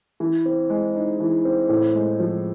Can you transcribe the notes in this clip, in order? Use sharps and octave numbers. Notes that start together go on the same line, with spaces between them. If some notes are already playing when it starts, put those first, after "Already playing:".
E3
C4
G#3
D#4
E3
C4
A2
G#3
F3